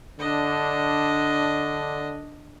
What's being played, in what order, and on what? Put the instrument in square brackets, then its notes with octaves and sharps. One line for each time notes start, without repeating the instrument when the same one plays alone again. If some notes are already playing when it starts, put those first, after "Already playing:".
[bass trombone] D3 [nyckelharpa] D4 D#5